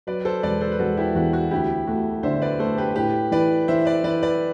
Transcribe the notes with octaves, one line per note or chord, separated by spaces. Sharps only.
F#3 B4 D5
A4 C5
E1 B4 D5
A4 C5
B4
E1 F#4 A4
E4 G4
E2 F#4
F#4
D2 E4 G4
A3 F#4
D3 C5 E5
B4 D5
A3 A4 C5
G4 B4
A2 G4 B4
E3 B4 D5
E3 C5 E5
B4 D5
E3 B4 D5
B4 D5